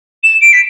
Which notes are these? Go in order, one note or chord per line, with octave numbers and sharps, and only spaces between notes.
E7
D7
B6